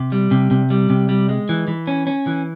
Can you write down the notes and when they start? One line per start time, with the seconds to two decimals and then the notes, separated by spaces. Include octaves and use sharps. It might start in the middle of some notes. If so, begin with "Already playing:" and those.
Already playing: C3
0.12 G3
0.31 C3
0.51 C3
0.70 G3
0.90 C3
1.09 G3
1.29 G#3
1.49 E3
1.68 E3
1.87 C#4
2.07 C#4
2.27 E3